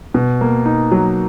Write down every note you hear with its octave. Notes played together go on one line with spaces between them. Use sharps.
B2
A#3
D#4
F#3